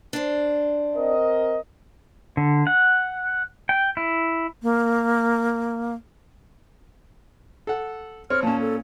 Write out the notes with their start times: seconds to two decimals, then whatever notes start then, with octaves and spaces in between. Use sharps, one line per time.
0.13 D4 C5
0.96 C4 A#4 D#5
2.37 D3
2.67 F#5
3.69 G5
3.97 E4
4.63 A#3
7.67 A4 F#5
8.30 C4 C#5 F6
8.43 A#2 C#4 A5
8.61 A4